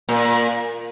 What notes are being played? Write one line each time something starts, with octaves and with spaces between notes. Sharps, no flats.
A#2